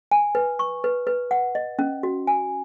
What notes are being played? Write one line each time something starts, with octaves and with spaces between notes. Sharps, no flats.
G#5
B4
C#6
B4
B4
F#5
D#5
C#4
F#4
G#5